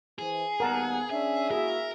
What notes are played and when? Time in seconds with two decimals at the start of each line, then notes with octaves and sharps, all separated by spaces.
0.19 E3 G#4 C5
0.60 D#2 G3 B3 A#4 F#5 A5 A#5
1.10 C#4 D4 G#4 E5
1.51 A#3 E4 F#4 G#4 A#4